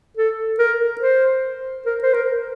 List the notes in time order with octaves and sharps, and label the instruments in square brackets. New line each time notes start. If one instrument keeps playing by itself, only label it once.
[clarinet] A4
A#4
C5
A#4
C5
A#4